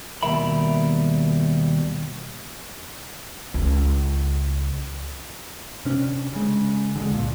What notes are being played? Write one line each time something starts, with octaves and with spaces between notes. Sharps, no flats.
D#2 B2 G3 A#4 E5 B5
C#2
C3 C#4 D4
C#3 G#3
D3 G3 G#3
C#2 A#2